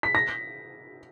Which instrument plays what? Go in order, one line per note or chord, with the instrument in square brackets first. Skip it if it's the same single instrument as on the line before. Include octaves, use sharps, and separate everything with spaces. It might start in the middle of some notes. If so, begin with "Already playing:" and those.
[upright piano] B6
A#6